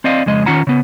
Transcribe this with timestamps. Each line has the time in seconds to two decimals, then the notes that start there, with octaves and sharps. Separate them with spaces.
0.04 C4 D5 D#5 F5
0.26 F2 C#3 G#3 D#5
0.46 D#3 C#4 F4 F#5 A#5
0.67 C#3 B3